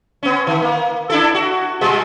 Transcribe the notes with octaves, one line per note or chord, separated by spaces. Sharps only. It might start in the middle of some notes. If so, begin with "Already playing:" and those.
B3 C#4
D#3
A#3
D4 E4 A4
F#4
B2 G3 G#3